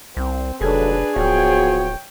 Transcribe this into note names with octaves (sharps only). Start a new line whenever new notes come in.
C2 C4
F1 D#2 F#3 D4 G#4 A4 B4
D1 F3 B3 F#4 C#5 G5